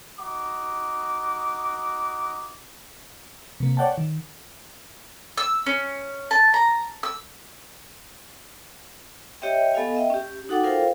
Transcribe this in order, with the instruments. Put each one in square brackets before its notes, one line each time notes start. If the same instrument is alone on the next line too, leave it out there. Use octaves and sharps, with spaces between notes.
[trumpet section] D#4 F#4 D6
[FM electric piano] C3 A#3
C#5 D5 F#5 G5 A5
D#3
[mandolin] E6
C#4
A5
A#5
E6
[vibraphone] G4 C#5 D#5 E5 G5
B3 A4 D#5 F5 G#5
D#5 E5 G5
C#4 G4
D#4 F#4 A4 F#5 G5 D6
F4 A4 A#4 C5 F5 G5